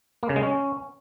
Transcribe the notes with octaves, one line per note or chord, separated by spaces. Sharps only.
A#3
C#3
G#3
C#4